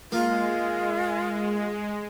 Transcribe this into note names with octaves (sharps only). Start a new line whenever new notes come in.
G#3 A#3 F4